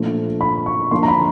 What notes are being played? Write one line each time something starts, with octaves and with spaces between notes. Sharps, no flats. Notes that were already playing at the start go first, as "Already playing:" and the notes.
Already playing: A#2 F3 A3 D4 F4
B5
C#6
F3 A#3 D4 C6
A#5
B5